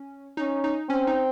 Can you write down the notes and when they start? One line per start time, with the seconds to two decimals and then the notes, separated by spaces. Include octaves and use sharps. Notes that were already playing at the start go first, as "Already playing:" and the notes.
Already playing: C#4
0.37 C#4 D#4
0.64 D#4
0.89 C4 C#4
1.07 D#4